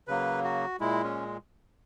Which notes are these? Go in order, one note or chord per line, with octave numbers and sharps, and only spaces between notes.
C#3 F#3 A#3 B4
F#4
A#2 G#3 E4
C#4